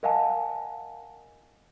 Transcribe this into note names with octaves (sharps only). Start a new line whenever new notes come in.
A#4 D#5 F5 F#5 G#5 A5